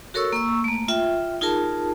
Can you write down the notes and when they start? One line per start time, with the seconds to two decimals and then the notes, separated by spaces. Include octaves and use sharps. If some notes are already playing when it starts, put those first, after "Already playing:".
0.14 F#4 A4 A#4 C#5 C#6 E6
0.33 A#3 C#6 E6
0.64 A3 A#3
0.88 F4 E5 G5
1.41 D#4 F4 G#4 A#4 A5